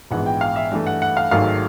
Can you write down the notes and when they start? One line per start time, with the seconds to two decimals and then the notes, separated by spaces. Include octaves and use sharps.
0.11 A#1 G#2 E3 G#3 B3 F#5
0.26 G5
0.41 F5
0.56 E5
0.71 G2 E3 A3
0.87 F#5
1.02 F#5
1.17 F5
1.31 G#1 G#2 D#3 F#3 A3 F5